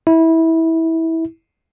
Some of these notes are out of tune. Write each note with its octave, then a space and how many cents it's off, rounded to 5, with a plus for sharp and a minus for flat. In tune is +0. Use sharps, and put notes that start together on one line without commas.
E4 -20